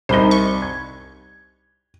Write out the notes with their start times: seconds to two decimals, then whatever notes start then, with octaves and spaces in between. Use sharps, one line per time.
0.09 C2 D#4 C5 B5 G7
0.31 C#6
0.62 G#6